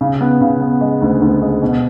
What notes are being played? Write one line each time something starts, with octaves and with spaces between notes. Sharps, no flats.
C#3
B3
C#3
B3
G#3
D2
D2
G#3
B2